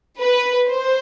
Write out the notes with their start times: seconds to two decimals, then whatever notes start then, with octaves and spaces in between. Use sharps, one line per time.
0.20 B4
0.68 C5